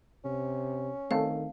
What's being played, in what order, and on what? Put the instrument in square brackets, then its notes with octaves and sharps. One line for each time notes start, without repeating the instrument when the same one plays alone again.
[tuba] C3 [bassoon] C#4
[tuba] D#3 [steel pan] A3 C4 A4 [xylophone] F5